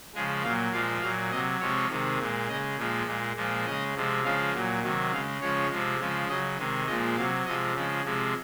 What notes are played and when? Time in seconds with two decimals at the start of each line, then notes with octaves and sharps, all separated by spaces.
0.14 C#3 F3 G#3 G#4
0.43 A#2 F#3 F5
0.72 A#2 F3 G#3 F5
1.02 A#2 F#3 F5
1.31 C3 F#3 D#5
1.60 C3 F3 G#3 C#5
1.89 C3 D#3 G#3
2.19 A#2 G#3
2.48 C#3 D#5
2.53 G#3
2.78 A#2 F3 G#3
3.06 A#2 G#3
3.36 A#2 F3 G#3
3.66 C#3 G#3 D#5
3.95 C3 F3 G#3
4.24 C#3 F3 G#3 F5
4.54 A#2 F#3
4.83 C3 D#3 F#3
5.12 C#3 G#3 F5
5.40 C#3 F3 G#3 C#5
5.70 C3 F3 G#3
5.99 C#3 F3 G#3
6.29 C#3 F#3 D#5
6.58 C3 D#3 G#3
6.87 A#2 F3 G#3 D#5
7.16 C3 F#3 F5
7.46 C3 F3 G#3 D#5
7.74 C#3 F3 G#3
8.04 C3 F3 G#3